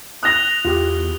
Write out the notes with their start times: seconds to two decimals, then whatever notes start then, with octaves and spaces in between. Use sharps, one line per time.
0.23 D#6 F#6 A#6 F7 G7
0.65 E2 F4 G4